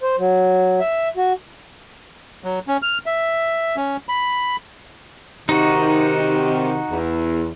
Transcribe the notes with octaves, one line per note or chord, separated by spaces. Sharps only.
C5
F#3
E5
F#4
F#3
C#4
F6
E5
C#4
B5
C3 D#3 D#4 F#4
E2